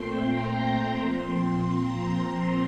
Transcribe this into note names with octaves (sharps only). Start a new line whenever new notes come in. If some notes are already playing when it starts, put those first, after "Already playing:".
Already playing: A#2 A3 C4 G5 C6
A#5
C6
A#2 F3 C4
A#5